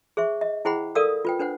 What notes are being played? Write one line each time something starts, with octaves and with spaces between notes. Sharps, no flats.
G#4 C5 E5 C#6
D#5
E4 G#4 C5 F#5 G5 B5
A4 A#4 D5 F5 D#6 E6
F4 B4 G5
D4 B4 C5 F#5